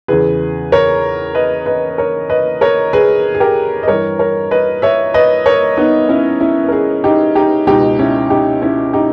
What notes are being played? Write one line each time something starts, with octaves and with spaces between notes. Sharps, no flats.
E2 C#3 E3 G#4 B4
A#4 C#5
B4 D#5
B4 D#5
A#4 C#5
B4 D#5
A#4 C#5
G#4 B4
G#4
G4 A#4
D#5
G2 E3 A#4 C#5
A#4 C#5
B4 D#5
C#5 E5
B4 D#5
A#4 C#5
B3 D#4
C#4 E4
C#4 E4
A#4
E4 G#4
D#4 G4
D#4 G4
C#2 B2 D#4 G4
C#4 E4
D#4 G4
C#4 E4
D#4 G4